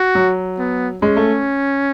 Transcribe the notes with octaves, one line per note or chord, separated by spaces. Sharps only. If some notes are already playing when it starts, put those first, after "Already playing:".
Already playing: F#4
F#3
B3
G#3 C#4
A3